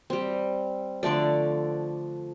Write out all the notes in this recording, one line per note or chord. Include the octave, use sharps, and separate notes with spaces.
G3 C4
D3 F3 A3 D5